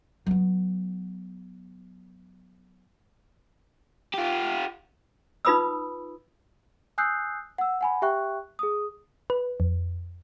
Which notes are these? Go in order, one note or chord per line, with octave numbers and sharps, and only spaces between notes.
F#3 B3
F4 G4
D#4 F4 B4 B5 D#6 E6
G#5 D#6 E6 F#6 G6 C7
F#5 E6
F#5 G#5 B5
G4 E5 G5 C#6 F#6
G#4 D#6
B4
F2